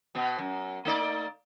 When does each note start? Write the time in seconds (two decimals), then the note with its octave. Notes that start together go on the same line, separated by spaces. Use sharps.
0.15 B2 B3
0.38 F#2
0.85 A3 D#4 D5